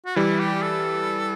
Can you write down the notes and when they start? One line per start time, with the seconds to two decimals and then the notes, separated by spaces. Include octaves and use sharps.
0.06 F#4
0.16 E3 G3 E4
0.40 G4
0.62 A4